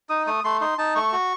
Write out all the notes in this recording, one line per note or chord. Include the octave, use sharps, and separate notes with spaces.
D#4 D#6
A3 D#6
A3 C6
D#4 C6
D#4 A5
A3 C#6
F#4